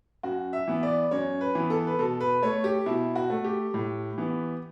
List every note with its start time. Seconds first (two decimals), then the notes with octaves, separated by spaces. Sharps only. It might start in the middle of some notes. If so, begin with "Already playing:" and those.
0.23 F#2 F#4
0.53 E5
0.67 E3 B3
0.83 D5
1.11 F#2 C#5
1.41 B4
1.55 E3 B3
1.70 A4
1.87 B4
1.99 B2 A4
2.21 B4
2.42 A3 C#5
2.64 G4
2.86 B2 E4
3.16 F#4
3.30 A3
3.44 G4
3.74 A2
4.18 E3 B3